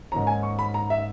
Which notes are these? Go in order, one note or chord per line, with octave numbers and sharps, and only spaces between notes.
G#2 D#3 A#3 C#4 A#5
G#5
C#6
B5
A#5
E5